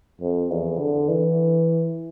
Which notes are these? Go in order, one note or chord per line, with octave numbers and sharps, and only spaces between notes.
F2
E2
D3
E3